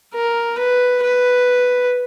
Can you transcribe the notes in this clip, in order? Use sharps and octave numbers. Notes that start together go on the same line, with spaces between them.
A#4
B4
B4